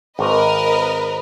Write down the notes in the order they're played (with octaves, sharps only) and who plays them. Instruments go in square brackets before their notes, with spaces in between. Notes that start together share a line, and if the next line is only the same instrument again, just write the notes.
[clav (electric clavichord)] G#1 [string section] A#4 B4 D#5